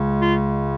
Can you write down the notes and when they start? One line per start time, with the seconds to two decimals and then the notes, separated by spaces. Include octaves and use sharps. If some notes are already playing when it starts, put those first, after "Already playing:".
Already playing: C#2 C#3 G#3
0.21 F4